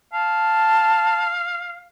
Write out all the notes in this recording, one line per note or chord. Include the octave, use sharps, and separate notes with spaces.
F5 A5